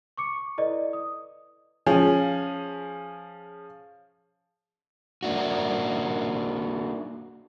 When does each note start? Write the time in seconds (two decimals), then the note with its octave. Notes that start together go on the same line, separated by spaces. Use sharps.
0.17 C#6 D6 C#7
0.58 E4 A4 B4 D5 D#5
0.93 D#6
1.86 F3 C#4 G#4
5.23 A#3 D4 F#4